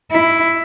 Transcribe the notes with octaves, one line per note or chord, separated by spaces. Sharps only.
E4